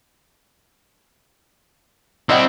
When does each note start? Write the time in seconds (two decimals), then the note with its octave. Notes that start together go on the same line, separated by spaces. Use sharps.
2.29 G3 C4 E4 D#5 F#5